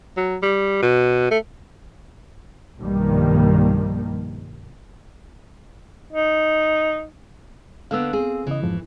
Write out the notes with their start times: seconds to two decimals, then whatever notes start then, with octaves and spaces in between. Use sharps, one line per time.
0.17 F#3
0.43 G3
0.82 B2
1.31 A3
2.81 B1 G2 D#3 F3 G3 A#3
6.13 D#4
7.91 D3 A#3 B3 F5 E6
8.13 C4 G#4
8.47 C#3 E3 D#5
8.62 F2 G#2 F3